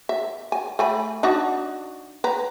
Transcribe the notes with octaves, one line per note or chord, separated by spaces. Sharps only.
E5
G#5
A3 G#5 B5
D4 D#4 F#4
B4 A#5